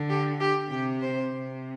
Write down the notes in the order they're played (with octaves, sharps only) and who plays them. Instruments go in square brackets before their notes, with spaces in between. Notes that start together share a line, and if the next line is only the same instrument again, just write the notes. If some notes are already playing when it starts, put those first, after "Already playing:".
Already playing: [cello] D3
[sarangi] G4
G4
[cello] C3 [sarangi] G4
[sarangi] C5
[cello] C3